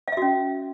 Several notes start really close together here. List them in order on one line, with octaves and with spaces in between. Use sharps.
F5 E5 F#4 C#4